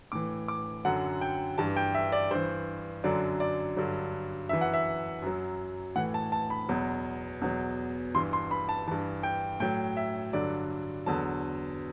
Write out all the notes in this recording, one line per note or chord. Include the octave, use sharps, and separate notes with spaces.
A2 E3 D6
D6
F#2 D3 F#3 F#5
G5
G2 E3 A5
G5
E5
D5
G2 E3 C5
F#2 D3 F#3 D5
D5
G2 D3 F#3
F#2 E3 E5
F#5
E5
F#2 F#3
A2 E3 F#5
A5
A5
B5
E2 B2 F#3
E2 B2 F#3
G2 E3 C6
C6
B5
A5
G2 E3 A5
G5
A2 F#3 G5
E5
G2 D3 F#3 D5
E2 D3 F#3 A5